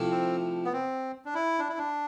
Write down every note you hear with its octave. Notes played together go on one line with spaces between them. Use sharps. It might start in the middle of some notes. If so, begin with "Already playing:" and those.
Already playing: C3 F3 A3 E4
C4
B3
C4
D4
E4
D4
E4
D4